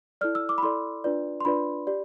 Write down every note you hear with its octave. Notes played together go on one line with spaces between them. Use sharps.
E4 A4 D5 F6
E6
D6
B5
E4 A4 D5 C6
D4 F4 B4 D5
C6
D4 F4 B4 D5 B5
G4 D5